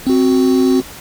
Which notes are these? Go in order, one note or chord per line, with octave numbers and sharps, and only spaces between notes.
C4 F#4